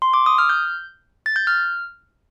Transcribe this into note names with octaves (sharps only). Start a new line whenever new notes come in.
C6
D6
D#6
F6
G6
A6
G6
F6